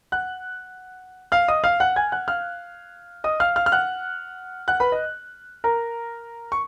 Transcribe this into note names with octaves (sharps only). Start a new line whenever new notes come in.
F#5 F#6
F5 F6
D#5 D#6
F5 F6
F#5 F#6
G#5 G#6
F#5 F#6
F5 F6
D#5 D#6
F5 F6
F5 F6
F6
F#5 F#6
F#5 F#6
B4 B5
D#5
A#4 A#5
C#6